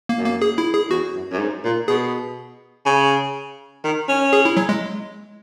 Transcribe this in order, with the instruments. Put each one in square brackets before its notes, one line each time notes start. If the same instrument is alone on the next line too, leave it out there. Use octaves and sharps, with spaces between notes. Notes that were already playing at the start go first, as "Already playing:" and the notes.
[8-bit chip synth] A#3
[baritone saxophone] F#2
[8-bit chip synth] A#3
G#4
E4
G#4
[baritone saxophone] E2 [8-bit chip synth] F#4
[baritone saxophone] F#2
F#2
G#2
A#2
[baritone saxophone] B2 [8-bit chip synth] G#4
[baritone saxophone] C#3
D#3
C#4
[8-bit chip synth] G#4
E4
F#3
G#3